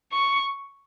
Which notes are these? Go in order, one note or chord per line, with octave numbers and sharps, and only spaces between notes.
C#6